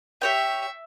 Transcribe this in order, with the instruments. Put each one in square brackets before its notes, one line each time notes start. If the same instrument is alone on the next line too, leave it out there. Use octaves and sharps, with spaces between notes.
[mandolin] G4 C#5 G5 [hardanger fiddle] E5